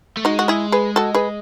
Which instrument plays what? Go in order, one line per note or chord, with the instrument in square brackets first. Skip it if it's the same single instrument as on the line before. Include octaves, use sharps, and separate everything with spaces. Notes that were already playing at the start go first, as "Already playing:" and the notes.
[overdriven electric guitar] A3
[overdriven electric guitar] G#3 [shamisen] D#4 F#4
[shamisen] F#4
E4 G#4
G#4 B4
F#4 A4
G#4 B4